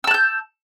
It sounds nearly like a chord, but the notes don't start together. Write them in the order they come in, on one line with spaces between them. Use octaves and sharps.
E6 A5 F#6 G6